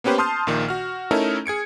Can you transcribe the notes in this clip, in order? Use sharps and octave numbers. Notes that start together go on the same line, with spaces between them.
A#3 B3 C#4 G4 B4 C5
A5 C6 D#6 F6 G6 C7
A#1 A#2 D#3
F#4 F6
A3 C#4 D#4 E4 A4 A#4
G#4 G#6 C#7 D7